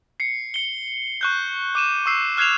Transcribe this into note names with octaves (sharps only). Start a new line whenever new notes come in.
C7 C#7
C#7 G7
C#6 F#6 G6
D6 D#7 E7
C#6 E6 C7
F6 F#6 G#6 C7 E7 F7